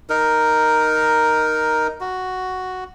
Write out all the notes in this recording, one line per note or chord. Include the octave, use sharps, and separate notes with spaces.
D#4 A#4
F#4